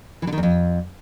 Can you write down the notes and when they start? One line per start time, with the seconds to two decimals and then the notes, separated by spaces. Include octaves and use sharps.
0.22 E3
0.27 D3
0.32 D#3
0.38 E2
0.43 F2